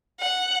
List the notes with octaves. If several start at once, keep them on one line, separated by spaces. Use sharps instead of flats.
F#5